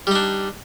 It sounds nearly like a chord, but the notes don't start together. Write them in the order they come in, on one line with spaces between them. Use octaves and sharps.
G3 D#4 D4